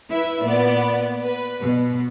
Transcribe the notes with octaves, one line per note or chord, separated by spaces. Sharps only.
E4 B4 E5
A#2 B3 D5
B4
B2